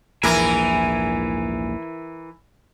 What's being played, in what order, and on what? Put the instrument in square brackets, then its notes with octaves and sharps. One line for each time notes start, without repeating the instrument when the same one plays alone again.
[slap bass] A#1 D#2 G#2 [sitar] E3 E4 A#4 [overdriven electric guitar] G#5